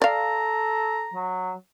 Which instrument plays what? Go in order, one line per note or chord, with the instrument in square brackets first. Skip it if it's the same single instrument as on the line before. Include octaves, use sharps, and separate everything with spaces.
[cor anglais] A4 [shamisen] D5 F5 [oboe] A#5
[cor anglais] F#3